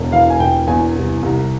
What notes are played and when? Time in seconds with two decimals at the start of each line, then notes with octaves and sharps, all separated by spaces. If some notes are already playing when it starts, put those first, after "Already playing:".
Already playing: E1
0.12 E3 F5
0.30 G#5
0.39 E1 G5
0.67 E2 G#5
0.96 C2
1.23 C2